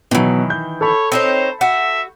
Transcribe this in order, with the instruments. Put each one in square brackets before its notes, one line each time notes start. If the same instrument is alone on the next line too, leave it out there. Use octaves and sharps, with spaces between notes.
[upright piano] B2 F#3 [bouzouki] D#3 E3
[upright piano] G6
[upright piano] A4 B5 [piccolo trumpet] C#5
[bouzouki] C4 D#4 C#5 [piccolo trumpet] C5
[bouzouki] F#4 [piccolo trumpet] E5